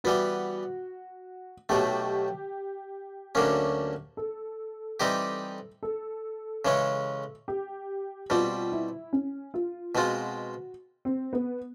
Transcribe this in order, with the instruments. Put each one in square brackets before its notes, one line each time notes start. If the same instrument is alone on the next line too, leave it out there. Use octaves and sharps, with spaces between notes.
[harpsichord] E3 G3 B3 [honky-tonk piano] F#4
[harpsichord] B1 B2 F#3 A3 [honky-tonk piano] G4
[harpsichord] D2 D3 F#3 A#3 C#4
[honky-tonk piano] A4
[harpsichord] E3 G3 C4 D#4 G4
[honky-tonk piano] A4
[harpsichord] C#3 E3 G#3 C#4
[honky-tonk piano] G4
[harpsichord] B2 G3 C4 [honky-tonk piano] F4
[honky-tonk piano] E4
C#4
F4
[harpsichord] B2 G#3 C4 F4 [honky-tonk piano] F#4
[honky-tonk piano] C4
B3